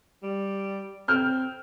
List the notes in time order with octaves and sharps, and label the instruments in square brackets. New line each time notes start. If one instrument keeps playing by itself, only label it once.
[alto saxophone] G3
[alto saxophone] C4 [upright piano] F6 G6